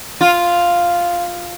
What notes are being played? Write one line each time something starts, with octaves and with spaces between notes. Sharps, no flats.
F4